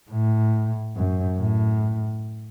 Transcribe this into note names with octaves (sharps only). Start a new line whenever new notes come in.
A2
F#2
A2